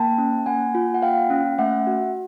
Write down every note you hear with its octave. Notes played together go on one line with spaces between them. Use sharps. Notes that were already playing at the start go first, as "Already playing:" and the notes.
Already playing: A#3 G5 A5
C#4
A#3 F#5 G#5
F4
F#5
A#3 F5 G5
C#4
A3 E5 F#5
F#4